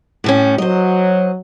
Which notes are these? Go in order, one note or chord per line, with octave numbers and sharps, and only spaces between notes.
A2 G3 C#4
F#3 C5 D#5